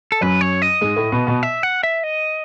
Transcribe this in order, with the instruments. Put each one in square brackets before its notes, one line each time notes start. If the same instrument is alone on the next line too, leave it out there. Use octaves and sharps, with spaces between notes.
[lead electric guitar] A4
[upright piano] F#2 F#3 [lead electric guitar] B4
[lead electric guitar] C#5
D#5
[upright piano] G#2 G#3
A2 A3
B2 B3
B2 B3
[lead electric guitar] E5
F#5
E5
D#5